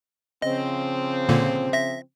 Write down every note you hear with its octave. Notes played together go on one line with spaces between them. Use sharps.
C#3 F3 C4 D#5
A#2 D3 A#3
E5 A#6